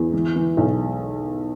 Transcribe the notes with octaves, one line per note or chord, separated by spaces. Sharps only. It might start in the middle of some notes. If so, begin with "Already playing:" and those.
Already playing: E2
E3
E3
B1